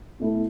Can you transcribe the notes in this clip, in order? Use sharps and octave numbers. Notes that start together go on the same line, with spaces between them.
B2 A3 E4